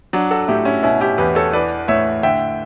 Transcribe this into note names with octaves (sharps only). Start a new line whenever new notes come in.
F#3 D4
F#4 A4
A2 E4 G4
C#4 E4
B2 C#4 E4
E4 G4
E2 G4 B4
A4 C#5
E3 B4 D5
A2 C#5 E5
D3 E5 G5